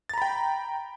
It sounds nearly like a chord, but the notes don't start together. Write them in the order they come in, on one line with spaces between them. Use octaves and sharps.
A6 A#5 B5 G5